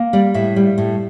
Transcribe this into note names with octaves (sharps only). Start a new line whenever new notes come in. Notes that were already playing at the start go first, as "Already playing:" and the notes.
Already playing: A#3
G3 D5
A2 E5
G3
A2